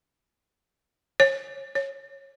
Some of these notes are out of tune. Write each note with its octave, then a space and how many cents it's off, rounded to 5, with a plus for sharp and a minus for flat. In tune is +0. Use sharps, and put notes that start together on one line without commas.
C#5 -35
C#5 -20